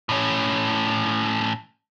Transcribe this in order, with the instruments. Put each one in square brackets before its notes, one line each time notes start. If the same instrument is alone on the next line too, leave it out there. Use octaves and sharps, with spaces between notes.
[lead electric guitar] A2 C#4